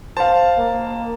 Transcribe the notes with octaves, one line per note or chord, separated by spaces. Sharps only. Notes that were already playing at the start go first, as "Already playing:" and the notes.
C5 F5 A5
A#3